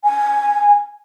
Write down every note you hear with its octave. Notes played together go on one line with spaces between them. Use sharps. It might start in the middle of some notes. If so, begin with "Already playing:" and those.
G#5